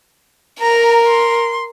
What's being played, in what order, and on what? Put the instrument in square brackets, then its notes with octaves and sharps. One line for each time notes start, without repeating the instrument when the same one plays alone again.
[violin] A#4 [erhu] A#5
[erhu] C6